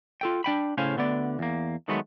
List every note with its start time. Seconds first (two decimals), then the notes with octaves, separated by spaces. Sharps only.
0.21 F4 A4 G5
0.44 D4 G5 B5
0.78 A2 C#3 C#4 C5 F5 G#5
0.97 D2 D3 B3 D5
1.39 E2 A#3
1.88 D#3 F#3 G#3 A3 B3